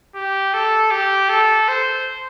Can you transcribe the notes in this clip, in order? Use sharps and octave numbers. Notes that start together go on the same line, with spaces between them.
G4
A4
G4
A4
C5